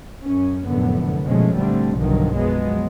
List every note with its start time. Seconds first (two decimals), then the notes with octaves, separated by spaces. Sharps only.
0.23 F#2 C#4
0.67 F1 F#2 A2 D3 B3
1.26 B2 F3 F#3 G#3 A3 C#4
1.57 A#1 D3 G3 A3 C4
1.95 B1 G2 D3 D#3 F3 F#3
2.35 F#2 F3 F#3 G#3 B3